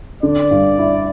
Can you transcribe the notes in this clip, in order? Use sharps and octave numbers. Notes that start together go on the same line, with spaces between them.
D3 D5
G2
E4